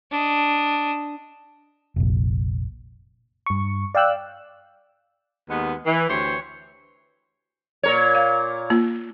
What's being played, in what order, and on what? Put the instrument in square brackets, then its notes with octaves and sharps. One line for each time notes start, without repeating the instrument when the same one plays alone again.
[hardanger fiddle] D4 D#5
[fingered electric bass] F1 A#1
[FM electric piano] G2 C#6
D5 F5 G5 E6 F#6
[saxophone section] D#2 G#3 B3
E3
D2 E3 G4 C5 C#5
[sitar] A#2 A#4 C#5
[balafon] F5
A#3 F4